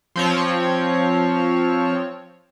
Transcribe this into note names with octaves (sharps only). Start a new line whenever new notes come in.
F3 C4 C#5